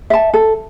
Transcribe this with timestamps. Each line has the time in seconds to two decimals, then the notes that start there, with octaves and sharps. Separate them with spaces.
0.10 E5 A5
0.34 A4